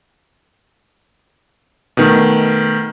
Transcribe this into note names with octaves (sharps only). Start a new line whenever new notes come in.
B2 D#3 A3